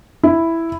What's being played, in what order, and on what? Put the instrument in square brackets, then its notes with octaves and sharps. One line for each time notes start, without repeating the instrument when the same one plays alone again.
[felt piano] E4